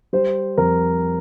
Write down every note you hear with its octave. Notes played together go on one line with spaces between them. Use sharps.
G3 C5
F2 A#4